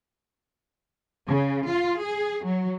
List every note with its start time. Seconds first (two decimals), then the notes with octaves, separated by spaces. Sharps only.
1.29 C#3
1.70 F4
2.03 G#4
2.46 F#3